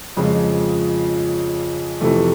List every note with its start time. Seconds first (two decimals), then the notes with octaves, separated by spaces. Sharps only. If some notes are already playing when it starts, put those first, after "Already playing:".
0.17 F2 C#3 F3 G#3
2.01 F2 C3 E3 A3